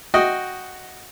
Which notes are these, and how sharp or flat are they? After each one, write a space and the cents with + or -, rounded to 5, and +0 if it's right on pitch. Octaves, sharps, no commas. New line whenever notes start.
F#4 +0 D#5 -5 G5 +0